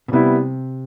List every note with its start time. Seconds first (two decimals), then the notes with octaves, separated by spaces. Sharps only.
0.08 B2
0.12 C3 G3 B3 E4